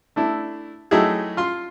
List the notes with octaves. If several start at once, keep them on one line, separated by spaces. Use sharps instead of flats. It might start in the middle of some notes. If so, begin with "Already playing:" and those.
A3 D4 E4
F#3 A3 D#4 E4 G4 G#4
F4 C6